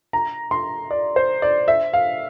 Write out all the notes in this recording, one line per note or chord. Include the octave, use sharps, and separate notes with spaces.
A#5
C6
D5
C5
D5
E5
F5